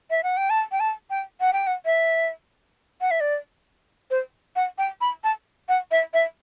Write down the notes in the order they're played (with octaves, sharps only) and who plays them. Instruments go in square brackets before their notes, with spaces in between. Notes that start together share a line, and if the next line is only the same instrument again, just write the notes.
[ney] E5
F#5
G5
A5
G5
A5
G5
F#5
G5
F#5
E5
F#5
E5
D5
C5
F#5
G5
B5
A5
F#5
E5
E5